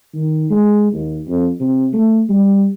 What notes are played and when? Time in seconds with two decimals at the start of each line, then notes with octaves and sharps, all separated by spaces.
0.14 D#3
0.50 G#3
0.93 D#2
1.28 F2
1.60 C3
1.93 A3
2.29 G3